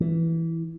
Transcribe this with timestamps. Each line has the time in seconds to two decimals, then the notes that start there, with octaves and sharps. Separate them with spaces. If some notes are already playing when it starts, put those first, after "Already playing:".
0.01 E3